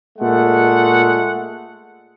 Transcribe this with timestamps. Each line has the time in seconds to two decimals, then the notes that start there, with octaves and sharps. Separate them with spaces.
0.18 A#2 G#3 A3 F#5